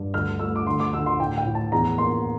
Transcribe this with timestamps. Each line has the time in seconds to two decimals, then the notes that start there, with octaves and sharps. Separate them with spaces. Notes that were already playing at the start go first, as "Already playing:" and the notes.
Already playing: G2
0.14 D2 F6
0.39 A3 E6
0.56 D6
0.66 D2 C6
0.80 D6
0.93 D2 E6
1.06 C6
1.19 A2 G5
1.38 G5
1.45 A2
1.55 A5
1.72 E2 A#5
1.98 A#3 C6